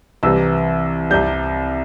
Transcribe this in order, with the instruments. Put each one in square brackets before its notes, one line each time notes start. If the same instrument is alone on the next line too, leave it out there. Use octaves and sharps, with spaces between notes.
[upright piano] C2 C3 E3 G3 E6
C2 C3 G3 G6